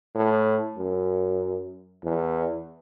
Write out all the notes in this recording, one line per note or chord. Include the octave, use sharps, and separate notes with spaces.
A2
F#2
E2